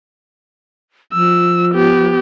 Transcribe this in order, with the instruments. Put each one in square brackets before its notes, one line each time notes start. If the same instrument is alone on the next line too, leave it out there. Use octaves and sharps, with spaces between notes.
[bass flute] F3 [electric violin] E6
[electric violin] B3 G4